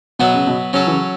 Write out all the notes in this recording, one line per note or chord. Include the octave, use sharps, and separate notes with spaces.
B2 F#3 B3 F#4 B4 E5
C#3
B2
C#3 F#3 C#4 A4
E3
C#3